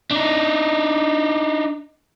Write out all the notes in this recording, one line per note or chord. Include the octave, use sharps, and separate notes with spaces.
D4 D#4